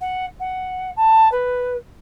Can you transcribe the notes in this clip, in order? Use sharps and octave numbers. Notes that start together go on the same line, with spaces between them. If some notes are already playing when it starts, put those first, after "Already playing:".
F#5
F#5
A5
B4